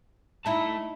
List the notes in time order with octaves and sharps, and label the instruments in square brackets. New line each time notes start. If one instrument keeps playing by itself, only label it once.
[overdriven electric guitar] A3 A5 [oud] D#4 E4